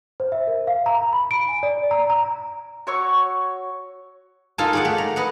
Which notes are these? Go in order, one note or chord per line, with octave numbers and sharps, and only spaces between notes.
C5
E5
A#4
F5
A#5
B5
D7
G#5
D5
A#5
A#5
F#4 C#5 C#6 E6
D#4 F4 A4 A#4 G#5 A5
G#4 D5 F#5
A3
A#5
B4 D#5 F#5